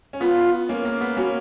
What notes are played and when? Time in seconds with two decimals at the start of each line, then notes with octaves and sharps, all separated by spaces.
0.13 C#4
0.21 B3 F4
0.69 A#3 C#4
0.85 A#3
1.01 B3
1.17 A#3 C#4 F#4